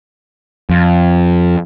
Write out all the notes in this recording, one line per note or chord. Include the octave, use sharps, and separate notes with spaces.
F2